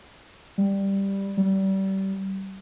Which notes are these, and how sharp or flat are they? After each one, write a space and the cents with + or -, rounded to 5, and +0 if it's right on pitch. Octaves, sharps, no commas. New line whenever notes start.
G3 +5
G3 -30